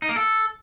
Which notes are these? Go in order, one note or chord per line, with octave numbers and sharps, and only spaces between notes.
D#4
A#3
A4